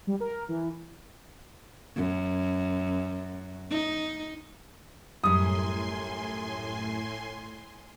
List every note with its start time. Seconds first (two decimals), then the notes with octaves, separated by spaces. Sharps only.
0.07 G3
0.20 A#4
0.49 E3
1.96 F#2
3.70 D#4
5.24 F#2 A2 G3 G#5 C6 D#6